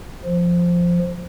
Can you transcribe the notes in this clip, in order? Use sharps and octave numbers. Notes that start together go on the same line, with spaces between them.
F3